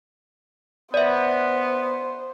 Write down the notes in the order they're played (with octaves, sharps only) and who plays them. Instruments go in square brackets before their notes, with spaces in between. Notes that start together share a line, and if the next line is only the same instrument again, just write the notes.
[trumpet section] B3 [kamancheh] C5 [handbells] D5 E5